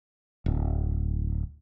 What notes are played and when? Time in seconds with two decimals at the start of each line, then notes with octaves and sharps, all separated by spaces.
0.46 D1